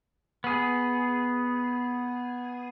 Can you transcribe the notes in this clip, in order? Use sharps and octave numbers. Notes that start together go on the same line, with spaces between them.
B3 G#4